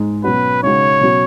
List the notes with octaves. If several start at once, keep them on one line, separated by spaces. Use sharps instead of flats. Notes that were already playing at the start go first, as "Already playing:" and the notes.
Already playing: G#2 G#3 D#4
B2 F#3 C#4 F#4 B4
C#3 G#3 D#4 F#4 C#5
B2 F#3 C#4 F#4